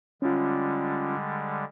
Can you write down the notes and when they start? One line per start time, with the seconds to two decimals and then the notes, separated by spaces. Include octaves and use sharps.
0.22 D3 G3 G#3 C#4 F4